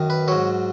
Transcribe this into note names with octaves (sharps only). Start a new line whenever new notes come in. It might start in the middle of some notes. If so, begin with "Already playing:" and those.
Already playing: F#2 D#3
B4
G#2 F#3 C#5